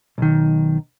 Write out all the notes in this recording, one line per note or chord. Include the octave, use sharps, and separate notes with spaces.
B1 D#3